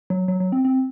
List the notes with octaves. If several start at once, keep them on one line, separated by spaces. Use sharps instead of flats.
F#3
F#3
F#3
C4
C4